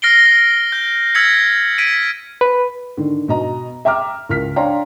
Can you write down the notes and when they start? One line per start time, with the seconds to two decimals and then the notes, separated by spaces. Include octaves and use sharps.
0.02 F6 A#6 C7 D7 G7
0.72 G6
1.15 E6 F6 G#6 A6 B6 C#7
1.78 G#6 B6 D7 D#7
2.41 B4
2.97 D3 D#3
3.28 B2 D#5 A#5
3.85 E5 G5 A#5 D6 F6
4.29 C#2 A#4 F6 B6
4.56 D4 C#5 F5 G5 A#5 C6